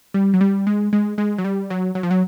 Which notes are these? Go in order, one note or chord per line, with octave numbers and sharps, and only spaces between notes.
G3
F#3
G3
G#3
G#3
G#3
F#3
G3
F#3
F#3
F3
F#3